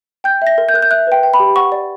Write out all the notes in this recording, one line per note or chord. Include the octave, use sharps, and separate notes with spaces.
G5 G6
E5 A#6
A#4
G6
A#4 F#6
G6
E5 F#6
B4 G5
G5
B5
G4
F#5 C#6
D5